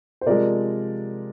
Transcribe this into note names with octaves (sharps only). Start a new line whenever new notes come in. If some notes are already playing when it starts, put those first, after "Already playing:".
C5
C3 F3 G#3 A#4 D5